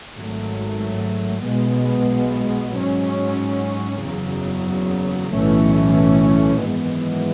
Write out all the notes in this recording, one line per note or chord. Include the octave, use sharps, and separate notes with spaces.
G#1 G#2 F#3 A3
B1 B2 G#3 B3
G#2 F#3 C#4
F#1 E2 C#3 F#3
B1 A2 E3 A3 C#4
G#1 F#2 E3 G#3 B3